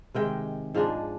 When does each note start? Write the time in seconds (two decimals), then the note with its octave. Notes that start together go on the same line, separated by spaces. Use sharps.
0.15 C3 D#3 G#3 G5
0.75 G#2 F3 G#3 D4